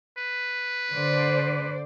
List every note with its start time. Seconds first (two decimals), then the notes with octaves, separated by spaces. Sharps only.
0.18 B4
0.92 D3 C5 D5